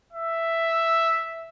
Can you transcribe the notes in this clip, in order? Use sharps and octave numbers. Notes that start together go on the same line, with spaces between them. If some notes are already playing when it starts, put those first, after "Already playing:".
E5